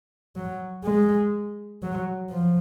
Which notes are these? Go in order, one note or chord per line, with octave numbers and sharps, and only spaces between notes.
F#3
G#3
F#3
F3